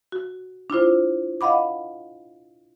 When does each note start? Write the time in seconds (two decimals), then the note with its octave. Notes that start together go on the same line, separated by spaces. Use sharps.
0.12 F#4
0.70 D4 E4 F4 C5
1.41 D#5 F5 F#5 B5 D6